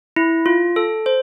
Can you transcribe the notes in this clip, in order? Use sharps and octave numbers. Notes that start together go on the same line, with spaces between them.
E4
F4
A4
C5